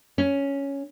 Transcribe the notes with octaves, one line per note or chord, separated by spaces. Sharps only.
C#4